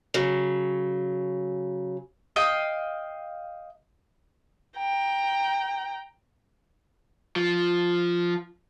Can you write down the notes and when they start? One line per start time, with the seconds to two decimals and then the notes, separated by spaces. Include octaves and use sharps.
0.14 C#3 F#3
2.36 D#5 F5 G5
4.78 G5 A#5
7.36 F3